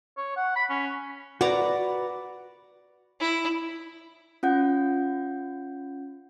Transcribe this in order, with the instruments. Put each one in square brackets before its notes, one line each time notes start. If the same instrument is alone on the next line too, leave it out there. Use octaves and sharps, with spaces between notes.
[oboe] C#5
F#5
B5
C#4
[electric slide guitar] F#4 B4 [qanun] D5 A#5
[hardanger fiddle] E4
[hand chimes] C#4 F4 F#5 G6